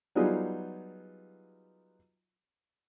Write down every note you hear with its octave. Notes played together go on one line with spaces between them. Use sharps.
F#3 G3 B3 D#4 F4 G#4